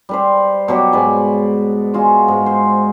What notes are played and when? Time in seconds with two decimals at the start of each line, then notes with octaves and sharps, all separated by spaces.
0.09 G3 B4 C5
0.68 B2 F#3 G4
0.93 G#2 B4 D5 G#5
1.94 G#3 F4 F#4
2.28 G#2
2.46 C5